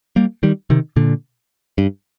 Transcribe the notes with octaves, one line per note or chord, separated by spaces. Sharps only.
G3 A#3
D#3 G3
C3 D#3
A#2 D3
G2